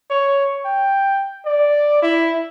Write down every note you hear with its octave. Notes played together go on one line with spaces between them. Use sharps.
C#5
G5
D5
E4